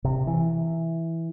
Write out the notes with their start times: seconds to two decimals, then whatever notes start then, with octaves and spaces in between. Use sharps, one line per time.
0.04 C3
0.27 E3